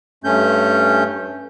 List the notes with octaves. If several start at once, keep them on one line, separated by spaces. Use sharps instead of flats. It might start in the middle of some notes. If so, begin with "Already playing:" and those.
G2 A3 C#4 G6